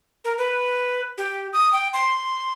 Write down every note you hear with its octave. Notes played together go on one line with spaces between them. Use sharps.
A#4
B4
G4
D#6
G5
C6